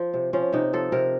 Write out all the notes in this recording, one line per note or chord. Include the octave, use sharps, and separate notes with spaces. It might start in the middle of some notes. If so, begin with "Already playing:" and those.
Already playing: F3
C3
F3 C#4
C3 D#4
F3 A4
C3 A#4